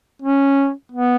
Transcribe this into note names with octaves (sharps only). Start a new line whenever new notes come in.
C#4
B3